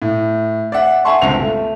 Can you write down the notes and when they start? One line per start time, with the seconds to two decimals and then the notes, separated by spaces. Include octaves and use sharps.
0.02 A2
0.72 D5 E5 F#5
1.05 E5 F#5 G#5 A5 C6 C#6
1.21 G1 C#2 C4 F7
1.39 A3